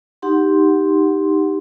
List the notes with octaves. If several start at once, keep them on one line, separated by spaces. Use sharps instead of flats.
D#4 G4 F#5 C6